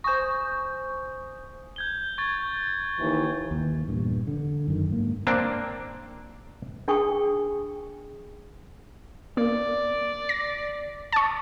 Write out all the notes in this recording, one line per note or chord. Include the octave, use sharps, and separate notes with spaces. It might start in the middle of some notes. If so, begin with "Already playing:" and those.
C5 G#5 C#6 D#6 G6
G6 G#6 G7
C#6 G#6 A6
D#2 E3
D#2
E2 G2 A#2
D3
F#2 D#3
G#2 A#3
A#3 C4 D4 C5
D4 G#4 G5 G#5 C#6 D#6
A#3 D5
A#6
A5 C#6